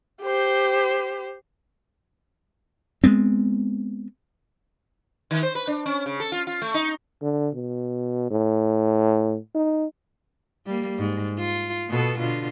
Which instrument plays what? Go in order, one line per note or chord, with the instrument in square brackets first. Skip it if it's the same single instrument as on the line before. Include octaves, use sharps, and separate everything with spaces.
[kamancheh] G4 C5
[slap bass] G#3 A3 B3 C4
[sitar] D#3
C5
B4
D4
C#4
C#3
A4
F4
F4
A3
D#4
[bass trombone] D3
B2
A2
D#4
[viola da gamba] G3 A#3
G#2
F4
B2 B3 A4
B2 D3 F4